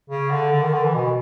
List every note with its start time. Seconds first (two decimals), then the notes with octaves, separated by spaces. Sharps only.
0.10 C#3
0.31 D3
0.52 D3
0.62 D#3
0.73 D3
0.84 E3
0.94 B2